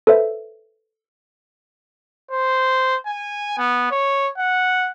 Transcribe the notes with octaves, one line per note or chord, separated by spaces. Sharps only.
A4 B4 C5 E5
C5
G#5
B3
C#5
F#5